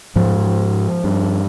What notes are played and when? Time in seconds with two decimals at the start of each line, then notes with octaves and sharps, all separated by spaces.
0.16 G#2 F3
1.04 G2